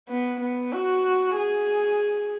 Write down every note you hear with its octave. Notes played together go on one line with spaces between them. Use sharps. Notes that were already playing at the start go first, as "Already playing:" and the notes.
B3
B3
F#4
G#4